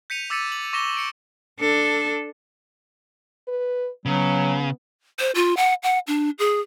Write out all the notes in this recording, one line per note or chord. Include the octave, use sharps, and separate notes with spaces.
G6 B6 C#7 D#7 F7
D6 E6 A6 B6 C#7 D#7
F#7
C#6 D6 A#6 B6 E7 G7
C#7 D7
D4 A4
B4
C#3 F#3 B3
C5
F4
F#5
F#5
D4
G#4